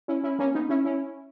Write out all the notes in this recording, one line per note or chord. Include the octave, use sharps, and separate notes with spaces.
C#4 E4
C#4 E4
A#3 C#4
B3 D#4
C#4 E4
C#4 E4